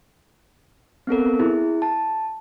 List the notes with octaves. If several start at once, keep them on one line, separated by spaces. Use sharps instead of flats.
B3 C4 A4 A#4
E4 G#4
A5